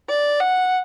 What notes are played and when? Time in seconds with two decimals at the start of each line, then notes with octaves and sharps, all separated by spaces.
0.09 D5
0.40 F#5